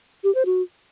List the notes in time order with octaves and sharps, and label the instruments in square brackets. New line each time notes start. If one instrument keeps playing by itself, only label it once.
[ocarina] G4
C5
F#4